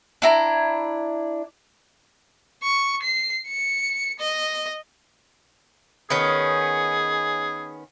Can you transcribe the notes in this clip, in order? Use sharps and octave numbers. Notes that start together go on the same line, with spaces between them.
D4 E4 A#5
C#6
C7
C#7
D#5
D#3 B3 C#4 G#4